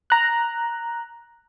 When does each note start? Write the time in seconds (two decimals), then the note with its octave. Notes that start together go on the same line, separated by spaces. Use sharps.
0.10 A#5 F#6